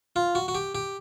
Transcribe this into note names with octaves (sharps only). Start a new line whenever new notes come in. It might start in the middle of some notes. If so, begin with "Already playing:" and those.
F4
F#4
F#4
G4
G4